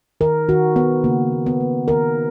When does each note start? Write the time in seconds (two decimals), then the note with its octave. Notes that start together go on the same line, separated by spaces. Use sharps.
0.21 D#3 A#4
0.49 D#3 F#4
0.76 D#3 B3
1.04 C#3 A#3
1.32 A#3
1.46 B3
1.60 A#3
1.88 D#3 A#4